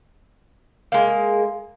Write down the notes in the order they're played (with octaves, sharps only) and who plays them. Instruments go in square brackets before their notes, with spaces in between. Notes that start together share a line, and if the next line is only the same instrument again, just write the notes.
[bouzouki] G#3 A#3